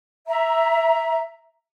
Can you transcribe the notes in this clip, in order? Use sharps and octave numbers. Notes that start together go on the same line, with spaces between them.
E5 A#5